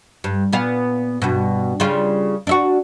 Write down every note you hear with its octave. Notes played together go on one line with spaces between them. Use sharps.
G2
A#2 B3 F5
G2 B2
C#3 G3 F4
D4 E4 F#4